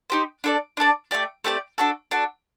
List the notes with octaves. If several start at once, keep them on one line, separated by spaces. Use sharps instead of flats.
D#4 G4 C5
D4 A4 D5
D4 A4 D5
A3 C4 G4 D5
A3 C4 G4 D5
D4 F#4 A4
D4 F#4 A4